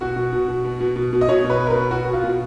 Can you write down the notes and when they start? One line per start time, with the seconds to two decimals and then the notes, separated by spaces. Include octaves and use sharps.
0.01 B2 F#4
0.16 B2
0.33 B2
0.48 B2
0.65 B2
0.80 B2
0.96 B2
1.13 B2
1.21 D#5
1.29 B2 C#5
1.44 B2
1.50 B4
1.60 B2
1.67 A#4
1.70 B2 B4
1.91 B2 F#4
2.08 B2
2.13 F4
2.24 B2